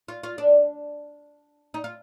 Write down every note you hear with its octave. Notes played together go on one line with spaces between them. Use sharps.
F4
F4
D4
D#4
F4